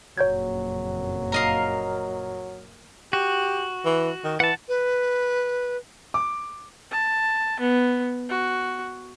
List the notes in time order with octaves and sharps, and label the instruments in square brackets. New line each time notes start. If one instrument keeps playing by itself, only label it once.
[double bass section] F#1 F2 A#2 [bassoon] F#3 [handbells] C#5 G6 G#6
[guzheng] A#4 D#5 F5
[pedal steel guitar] F#4 [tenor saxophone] G4
[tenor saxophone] E3
D#3
[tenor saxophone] E3 [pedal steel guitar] F#5 A5
[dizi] B4
[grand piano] D6
[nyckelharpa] A5
B3
F#4